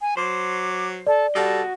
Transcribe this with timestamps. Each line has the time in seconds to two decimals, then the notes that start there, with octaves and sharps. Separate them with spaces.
0.01 G#5
0.17 F#3 C5 D6
1.07 A4 D5
1.35 G3 F#4 A4 D#5